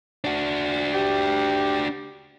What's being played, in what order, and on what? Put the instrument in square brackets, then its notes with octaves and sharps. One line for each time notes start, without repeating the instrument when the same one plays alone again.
[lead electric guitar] D4 F#4
[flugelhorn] G4